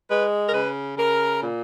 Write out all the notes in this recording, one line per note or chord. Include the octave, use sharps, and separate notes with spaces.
G#3 B4
A#4
C#3 B4
C#3 A#4
A#2